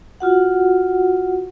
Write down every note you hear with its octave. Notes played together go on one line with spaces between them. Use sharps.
F4 F#4 F#5